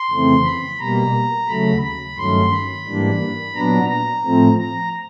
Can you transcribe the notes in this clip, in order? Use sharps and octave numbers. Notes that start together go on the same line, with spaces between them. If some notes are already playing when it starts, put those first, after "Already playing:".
Already playing: C6
F2 C#3 E3 A3 C4
B5
B2 G3 A#3 A#5
D#2 C#3 F#3 A3 B5
B5
G2 D#3 F#3 A3 C#4 C6
B5
G#2 E3 G3 A#3 D4
A#2 F#3 B3 D4 A#5
A#5
A2 F3 A3 C4
A#5